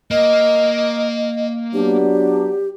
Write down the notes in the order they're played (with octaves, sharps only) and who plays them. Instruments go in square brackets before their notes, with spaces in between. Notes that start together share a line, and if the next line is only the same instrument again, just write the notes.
[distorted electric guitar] A#3 [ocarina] D#5
[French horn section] F#3 B3 D4 [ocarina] G4